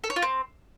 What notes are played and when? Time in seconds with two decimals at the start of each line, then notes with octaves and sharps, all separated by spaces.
0.04 A4
0.10 C#5
0.16 F4
0.22 C4